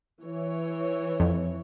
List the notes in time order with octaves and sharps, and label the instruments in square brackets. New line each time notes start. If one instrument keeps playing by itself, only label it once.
[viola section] E3 C#5
[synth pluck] F2